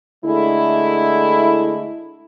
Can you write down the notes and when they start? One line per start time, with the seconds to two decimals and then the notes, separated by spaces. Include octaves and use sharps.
0.25 D3 G#3 A3 E4